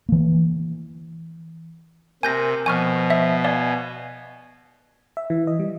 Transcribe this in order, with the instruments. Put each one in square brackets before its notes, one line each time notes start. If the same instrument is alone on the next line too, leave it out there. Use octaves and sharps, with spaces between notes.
[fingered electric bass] E3 A#3
[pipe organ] C3 [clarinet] A#4 [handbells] G#5 G6 A#6
[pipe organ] B2 [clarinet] F3 [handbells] G#5 C#6 F6
[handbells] E5
[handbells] D5 F5 [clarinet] G#5
[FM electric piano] E5
E3
D#5
G3